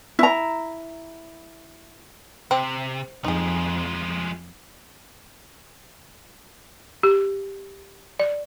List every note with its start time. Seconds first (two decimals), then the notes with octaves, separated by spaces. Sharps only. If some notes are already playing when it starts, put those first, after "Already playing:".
0.19 E4 A#5
2.51 C3 C4
3.24 F2 F3 G#3 D#4 G#4
7.03 G4
8.19 D5